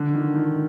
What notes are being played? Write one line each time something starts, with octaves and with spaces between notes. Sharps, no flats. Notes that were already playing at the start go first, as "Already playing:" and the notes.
Already playing: D3
D#3
D#3